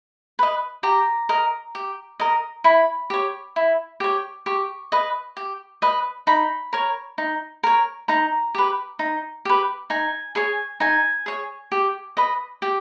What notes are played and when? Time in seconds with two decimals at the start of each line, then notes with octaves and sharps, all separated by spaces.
0.39 B4 D#5
0.83 G4 A#5
1.29 A#4 D#5
1.75 G4
2.20 A#4 D#5
2.64 E4 B5
3.10 G4 C#5
3.56 E4
4.00 G4 C#5
4.46 G4 C#6
4.92 B4 D#5
5.37 G4
5.82 B4 D#5
6.27 D#4 B5
6.73 A#4 C#5
7.18 D#4
7.63 A#4 C#5
8.08 D#4 A#5
8.55 G4 B4
8.99 D#4
9.45 G4 B4
9.90 D#4 G#5
10.35 G#4 C#5 G#5
10.80 D#4 G#5
11.26 G#4 C#5
11.72 G4
12.17 B4 D#5
12.62 G4 G5